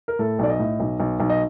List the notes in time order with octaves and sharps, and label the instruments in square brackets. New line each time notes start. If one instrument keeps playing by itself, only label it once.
[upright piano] A#4
A2 A4
B1 D5
D#5
A2
B1
B1
B1
D#5